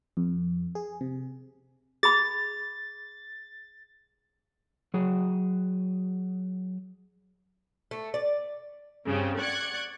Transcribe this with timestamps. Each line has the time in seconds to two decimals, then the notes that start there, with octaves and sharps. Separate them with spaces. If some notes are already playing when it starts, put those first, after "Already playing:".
0.17 F2
0.75 G#4
1.01 C3
2.03 G#4 B5 A6
4.94 F#3 F#4 G#4
7.91 A3
8.14 D5
9.06 G2 C#3 G3 C4
9.39 D5 F#5 C#6 F#6 G#6